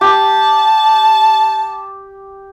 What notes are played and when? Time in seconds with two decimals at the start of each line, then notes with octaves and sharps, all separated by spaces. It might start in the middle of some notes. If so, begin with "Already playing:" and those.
0.01 G4 A5